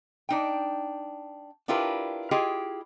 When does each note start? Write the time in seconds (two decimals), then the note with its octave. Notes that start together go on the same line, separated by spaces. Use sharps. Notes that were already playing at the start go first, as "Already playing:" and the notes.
0.29 D4 D#4 G5
1.68 D4 E4 F4 G4 A#4 B4
2.31 E4 F4 G4 G#4 D#5